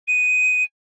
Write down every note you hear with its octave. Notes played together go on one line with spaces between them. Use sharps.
D#7